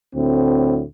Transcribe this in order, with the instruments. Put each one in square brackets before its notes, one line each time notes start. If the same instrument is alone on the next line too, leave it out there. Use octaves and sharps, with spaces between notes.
[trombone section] D2 A2 C4